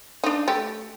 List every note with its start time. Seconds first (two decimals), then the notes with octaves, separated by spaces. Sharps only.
0.24 D4 D#4
0.48 A3 G4